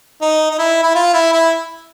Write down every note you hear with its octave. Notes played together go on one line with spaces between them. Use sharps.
D#4
D#4
E4
E4
F4
E4
E4